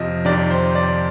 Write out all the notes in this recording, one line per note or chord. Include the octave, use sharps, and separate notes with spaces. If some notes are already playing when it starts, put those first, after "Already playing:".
Already playing: F2 C3 F3 D#5
F2 C3 D#3 D5
C5
D5